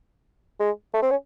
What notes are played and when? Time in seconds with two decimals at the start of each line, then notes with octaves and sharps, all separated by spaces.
0.60 G#3
0.94 A3
1.02 C4
1.11 C#4